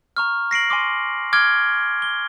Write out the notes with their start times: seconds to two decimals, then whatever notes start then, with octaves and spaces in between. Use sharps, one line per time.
0.17 A#5 C#6 F6
0.51 A#6 C7 D7 F#7
0.70 G#5 C6 D6
1.33 D6 F6 G#6 D7 G7
2.02 G7